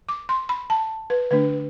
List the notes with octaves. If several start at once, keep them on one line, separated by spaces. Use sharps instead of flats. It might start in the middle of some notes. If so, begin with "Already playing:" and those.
D6
C6
B5
A5
B4
D3 A3 D4 B4